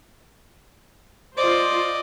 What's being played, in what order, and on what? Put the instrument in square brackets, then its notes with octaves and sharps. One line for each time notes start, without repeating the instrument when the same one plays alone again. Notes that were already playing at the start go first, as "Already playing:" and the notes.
[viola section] F4 C5 [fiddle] D5 D#5